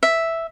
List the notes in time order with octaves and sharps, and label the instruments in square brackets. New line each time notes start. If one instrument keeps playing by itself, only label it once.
[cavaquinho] E5